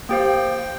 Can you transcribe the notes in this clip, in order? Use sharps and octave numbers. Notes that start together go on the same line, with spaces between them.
A#3 G4 C5 F5 G5